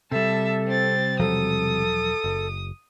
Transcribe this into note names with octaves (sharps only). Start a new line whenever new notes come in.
C3 G3 A4 E5 A5
C4 A6
E1 F3 F#3 A4 D#6
F#1